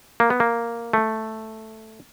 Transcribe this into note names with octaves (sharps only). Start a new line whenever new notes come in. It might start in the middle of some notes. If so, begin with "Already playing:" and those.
A#3
B3
A#3
A3